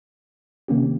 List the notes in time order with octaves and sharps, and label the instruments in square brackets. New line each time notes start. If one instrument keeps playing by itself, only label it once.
[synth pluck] C3 D#3 A#3 C#4 G4